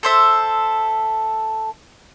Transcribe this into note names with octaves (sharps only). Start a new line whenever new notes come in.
A4 C5 E5